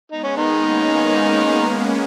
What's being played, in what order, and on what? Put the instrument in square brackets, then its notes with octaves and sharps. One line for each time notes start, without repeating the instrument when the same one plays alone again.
[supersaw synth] G#3 B3 [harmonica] D#4
[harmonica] C#4
D#3 D#4
[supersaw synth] A#3 C#4
G#3 B3
A#3 C#4